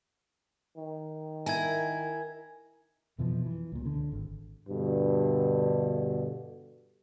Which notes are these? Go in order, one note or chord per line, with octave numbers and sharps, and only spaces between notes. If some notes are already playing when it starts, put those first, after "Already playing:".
D#3
E4 A#4 G#5 G#6
F2 B2 E3 F3
E3
C#2 A#2
C#2 D3
G#1
G2 B2 D3